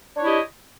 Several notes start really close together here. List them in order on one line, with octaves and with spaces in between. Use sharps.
D4 C#5 E4 D#5 G4